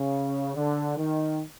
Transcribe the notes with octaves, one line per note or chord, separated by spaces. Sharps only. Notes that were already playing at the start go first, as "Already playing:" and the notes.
Already playing: C#3
D3
D#3